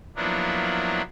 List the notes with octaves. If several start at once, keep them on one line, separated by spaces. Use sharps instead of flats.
F3 F#3 A#3 B3 D4 E4